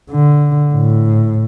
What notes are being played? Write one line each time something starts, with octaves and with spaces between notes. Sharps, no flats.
D3
A2